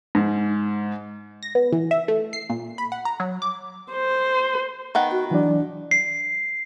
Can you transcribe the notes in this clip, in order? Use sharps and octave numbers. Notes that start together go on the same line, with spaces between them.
G#2
A#6
B3
E3
E5
A3
C7
A#2
B5
F#5
A#5
F#3
D6
C5
D#3 B3 F#5
F#4
E3 F#3 D4 D5
C7